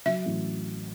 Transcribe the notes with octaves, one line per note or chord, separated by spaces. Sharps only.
F#3 E5
A1